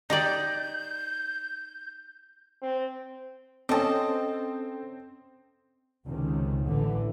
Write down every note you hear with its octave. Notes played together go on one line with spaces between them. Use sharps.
D#4 G4 D5 G6
C4
C4 C#4 A4 D#5 A5
C#2 C3 D#3
A1 D3 E3